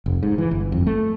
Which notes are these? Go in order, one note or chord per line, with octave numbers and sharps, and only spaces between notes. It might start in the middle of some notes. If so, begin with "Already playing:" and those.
F1
G#2
E3
G1
F2
A3